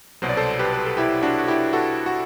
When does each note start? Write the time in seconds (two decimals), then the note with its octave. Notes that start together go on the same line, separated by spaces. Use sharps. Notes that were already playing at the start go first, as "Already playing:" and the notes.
0.22 C2 B2 F#3 C5
0.29 D5
0.37 A4 C5
0.59 G4 B4
0.74 B4
0.86 A4
0.97 E4 G4
1.22 D4 F#4
1.38 F#4
1.48 E4 G4
1.73 F#4 A4
2.06 F#4